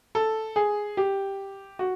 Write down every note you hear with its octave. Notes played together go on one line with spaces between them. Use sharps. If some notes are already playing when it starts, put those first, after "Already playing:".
A4
G#4
G4
F#4